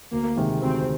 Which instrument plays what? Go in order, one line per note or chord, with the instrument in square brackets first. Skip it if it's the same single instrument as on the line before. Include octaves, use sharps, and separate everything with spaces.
[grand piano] D2 [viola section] A#3
[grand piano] C3 D#3 G#3
[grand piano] D2 [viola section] C4